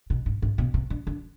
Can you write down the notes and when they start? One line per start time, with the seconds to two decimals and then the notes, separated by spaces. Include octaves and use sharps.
0.10 B2
0.26 G#2
0.42 G#2
0.58 B2
0.74 C3
0.90 D3
1.07 D3